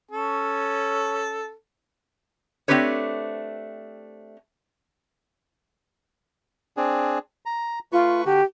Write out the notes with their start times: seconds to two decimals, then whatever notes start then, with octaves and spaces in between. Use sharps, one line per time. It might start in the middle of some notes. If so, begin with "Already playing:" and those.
0.11 C#4 A4
2.68 A3 C4 D4 G4 B4 C#5
6.77 C4 D4 G#4
7.46 A#5
7.92 A3 F4 B4 C#6
8.25 D3 F#4 G4